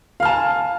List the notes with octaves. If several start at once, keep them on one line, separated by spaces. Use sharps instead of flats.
F5 G#5 A5 F6